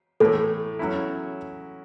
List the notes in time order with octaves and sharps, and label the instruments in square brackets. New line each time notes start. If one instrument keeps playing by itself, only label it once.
[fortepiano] A2 E3 A3 [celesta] A4
[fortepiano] F#3 C#4 E4